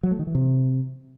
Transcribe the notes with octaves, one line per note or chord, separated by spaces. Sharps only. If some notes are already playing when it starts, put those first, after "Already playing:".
F#3
A3
D#3
E3
C3